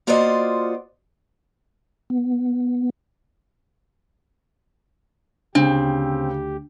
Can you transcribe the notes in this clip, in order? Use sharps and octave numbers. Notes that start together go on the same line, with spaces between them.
A#3 F4 F#4 C5 D5 D#5
B3
D2 C#3 C4 D4 G4